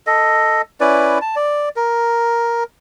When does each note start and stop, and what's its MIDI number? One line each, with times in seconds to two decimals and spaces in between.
0.07 0.62 69
0.07 0.62 75
0.80 1.19 61
0.80 1.19 64
0.80 1.19 71
0.80 1.19 74
1.21 1.35 81
1.36 1.69 74
1.76 2.64 70